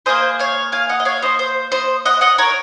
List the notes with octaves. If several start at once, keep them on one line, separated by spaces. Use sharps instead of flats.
A#3 D#4 G#4 C5 D#5
C#5 F5
F5 G#5
D#5 F#5
D#5
C#5 F5
C5 D#5
C5
C5 D#5
D#5 F#5
D#5 F#5
A#4 C#5